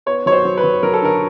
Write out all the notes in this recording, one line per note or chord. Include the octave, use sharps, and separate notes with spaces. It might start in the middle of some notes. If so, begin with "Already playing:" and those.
B3 C#5
F#3 C#5
C5
F#3
B4
F#3
F#3 A#4
A4
D3 A#4